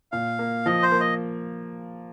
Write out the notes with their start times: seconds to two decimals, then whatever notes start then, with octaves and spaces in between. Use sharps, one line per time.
0.12 A#2 F5
0.39 A#3
0.66 F3 D#5
0.82 C5
0.92 A#3
1.01 D#5